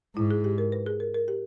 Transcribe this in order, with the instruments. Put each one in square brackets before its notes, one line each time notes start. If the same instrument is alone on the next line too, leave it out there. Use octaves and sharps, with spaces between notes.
[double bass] G#2 [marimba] E4
[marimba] G#4
G4
A#4
B4
G#4
A#4
A#4
G4